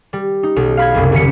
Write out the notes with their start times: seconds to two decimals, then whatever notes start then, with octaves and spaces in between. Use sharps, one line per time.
0.13 G3
0.43 D#4
0.56 B1
0.77 F5 B5 G#6
0.94 F#1 C2
1.12 D#1 C#3 B6 C#7